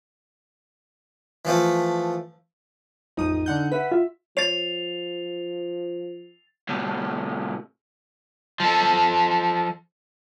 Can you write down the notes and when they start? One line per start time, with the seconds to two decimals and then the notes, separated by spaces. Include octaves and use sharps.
1.45 E3 F3 A3
3.17 A1 F2 D#4 D#6
3.46 D3 F#5 G6
3.72 B4 E5 F#5 B6
3.91 F4 E5
4.37 F3 C#5 A6 C7 F7
6.69 A2 C3
8.60 F3 A4